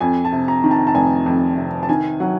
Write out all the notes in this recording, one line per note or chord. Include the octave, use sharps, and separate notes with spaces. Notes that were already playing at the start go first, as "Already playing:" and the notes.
F2 G#5
A5
C3
A#5
D#3
A5
A5
F1 G#5
F2
C3
A5
D#3 G#5
F#3 F#5